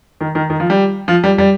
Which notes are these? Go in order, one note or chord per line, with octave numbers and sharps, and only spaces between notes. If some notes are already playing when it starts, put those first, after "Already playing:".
D#3
D#3
D#3
F3
G3
F3
G3
G3